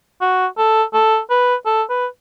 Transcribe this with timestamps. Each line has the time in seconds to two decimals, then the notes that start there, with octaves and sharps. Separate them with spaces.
0.21 F#4
0.58 A4
0.94 A4
1.30 B4
1.66 A4
1.90 B4